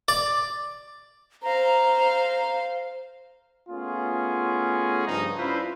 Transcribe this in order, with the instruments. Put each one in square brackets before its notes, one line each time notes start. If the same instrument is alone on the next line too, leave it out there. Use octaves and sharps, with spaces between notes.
[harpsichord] D5
[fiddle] C5 F5 [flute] A#5
[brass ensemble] A3 B3 C#4 F4 F#4 G#4
G2 C#3 F3 G3 D#4
C#4 D4 E4 F4 B4 C5